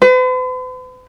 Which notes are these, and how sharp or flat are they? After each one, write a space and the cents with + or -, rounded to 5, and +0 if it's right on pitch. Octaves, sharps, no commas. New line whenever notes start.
B4 +45